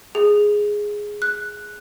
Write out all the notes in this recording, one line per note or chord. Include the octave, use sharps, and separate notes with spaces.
G#4
F#6